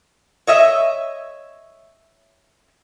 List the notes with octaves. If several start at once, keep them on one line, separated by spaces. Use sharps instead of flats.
C#5 D#5 E5